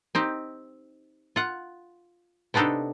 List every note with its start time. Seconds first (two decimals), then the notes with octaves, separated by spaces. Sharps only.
0.15 C4 D#4 G4
1.36 F4 F#5
2.54 C3 B3 D4 D#4 A4